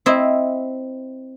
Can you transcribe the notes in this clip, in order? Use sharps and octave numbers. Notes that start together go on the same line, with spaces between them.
C4 E4 D#5